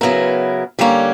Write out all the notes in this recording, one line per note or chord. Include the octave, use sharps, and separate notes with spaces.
C#3 F#3 B3 E4 A#4
D3 G3 A#3 C#4